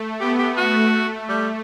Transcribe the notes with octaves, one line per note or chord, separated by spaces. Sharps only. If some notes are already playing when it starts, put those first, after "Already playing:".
Already playing: A3
B3 G4
G4
F#4
A3
G3